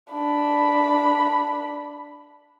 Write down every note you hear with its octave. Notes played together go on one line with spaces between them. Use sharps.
D4 B5